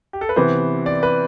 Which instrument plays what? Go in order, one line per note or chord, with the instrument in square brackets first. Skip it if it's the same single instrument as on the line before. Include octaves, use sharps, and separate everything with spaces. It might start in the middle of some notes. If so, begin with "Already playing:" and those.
[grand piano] G4
A4
B4
[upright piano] C3 E3 B3 [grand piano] C5
[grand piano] D5
B4